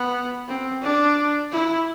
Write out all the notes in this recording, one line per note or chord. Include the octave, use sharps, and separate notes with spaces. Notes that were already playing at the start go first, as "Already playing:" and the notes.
Already playing: B3
C4
D4
E4